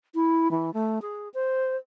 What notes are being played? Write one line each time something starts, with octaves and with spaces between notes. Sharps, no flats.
E4
E3
A3
G#4
C5